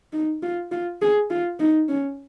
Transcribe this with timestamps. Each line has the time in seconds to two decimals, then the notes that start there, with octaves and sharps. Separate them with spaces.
0.13 D#4
0.43 F4
0.71 F4
1.02 G#4
1.30 F4
1.60 D#4
1.89 C#4